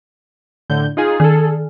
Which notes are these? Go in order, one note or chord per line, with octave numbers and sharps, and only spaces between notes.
A2 D3 G6
D#4 F4 G#4
D#3 G#4 A4